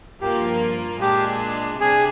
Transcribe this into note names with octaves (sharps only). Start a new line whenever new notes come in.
G2 F3 A#3 F4 G4
A#2 G#3 D4 G4
C3 G3 D4 G#4